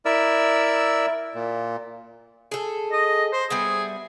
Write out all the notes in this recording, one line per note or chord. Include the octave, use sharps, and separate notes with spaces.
E4 A#4 D5 E5 E6
A#2
G#4 A4
D#5
C5
G3 B3 E4 G#4